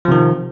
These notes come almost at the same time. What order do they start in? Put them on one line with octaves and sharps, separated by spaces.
F3 C3 D#3